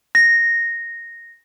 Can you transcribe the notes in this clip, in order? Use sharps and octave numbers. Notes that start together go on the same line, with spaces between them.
A#6